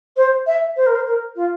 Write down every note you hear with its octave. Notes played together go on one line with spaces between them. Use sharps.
C5
E5
C5
A#4
C5
A#4
F4